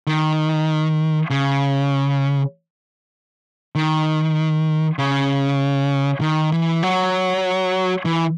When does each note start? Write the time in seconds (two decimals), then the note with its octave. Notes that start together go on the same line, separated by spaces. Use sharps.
0.07 D#3
1.30 C#3
3.75 D#3
4.99 C#3
6.21 D#3
6.52 E3
6.83 F#3
8.05 E3